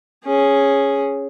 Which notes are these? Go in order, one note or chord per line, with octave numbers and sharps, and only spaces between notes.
C#4 G#4